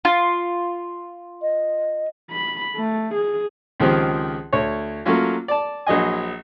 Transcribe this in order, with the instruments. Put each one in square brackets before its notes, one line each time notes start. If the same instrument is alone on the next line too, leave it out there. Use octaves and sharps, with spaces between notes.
[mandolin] F4
[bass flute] D#5
[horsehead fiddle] B5
A3
G#4
[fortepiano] C#2 D#3 F3 C4 G4 G#4
D2 C#5
F#3 A3 A#3 C#4 F4
D5 A5
A#1 F#3 D#5 G#5